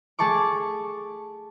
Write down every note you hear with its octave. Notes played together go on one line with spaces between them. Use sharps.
A3 G#4 A5 C#6 D6